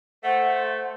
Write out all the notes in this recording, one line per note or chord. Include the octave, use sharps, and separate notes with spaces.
A3 C5 F#5